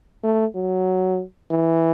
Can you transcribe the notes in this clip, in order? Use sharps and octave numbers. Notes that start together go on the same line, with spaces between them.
A3
F#3
E3